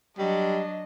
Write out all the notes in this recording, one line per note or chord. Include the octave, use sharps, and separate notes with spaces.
F#3 G3 D4 D#5